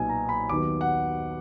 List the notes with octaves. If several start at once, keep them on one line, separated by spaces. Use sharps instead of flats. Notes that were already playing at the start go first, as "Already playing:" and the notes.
Already playing: B1 A#2 F#3 B3 D#4 G#5
A#5
B5
D#2 D#3 F#3 B3 D#4 D6
F#5